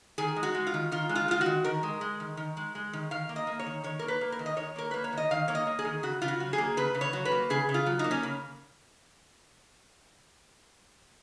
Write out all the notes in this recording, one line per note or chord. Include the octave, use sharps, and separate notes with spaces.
D#3 G#4
G#3
F#4
G#3
F4
D#3
D#3 F4
G#3
F4
G#3 F4
F#4
D#3
D#3 A#4
G#3
G#3
D#3
D#3
G#3
G#3
D#3
D#3 F5
A#3
D#5
A#3
C#5
D#3
D#3 C#5
A#3 A#4
B4
A#3
A#4
D#3
D#5
D#3 C#5
A#3 A#4
A#3 B4
C#5
D#3 D#5
D#3 F5
A#3 C#5
D#5
A#3
G#4
D#3
C#3 F#4
C#3 F4
F#4
F#3
G#4
A#3
C#3 B4
C#3
C#5
F#3
B4
A#3
C#3 G#4
C#3
F4
F#3
A#3 D#4
C#4
C#3